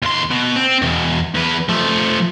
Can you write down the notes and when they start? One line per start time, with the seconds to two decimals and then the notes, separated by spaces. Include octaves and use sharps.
0.03 D#2 C6
0.31 B2
0.56 C4
0.82 E2 B2
1.34 E2 B4
1.69 F3 A3